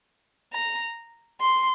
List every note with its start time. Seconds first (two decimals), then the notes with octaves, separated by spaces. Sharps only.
0.53 A#5
1.41 C6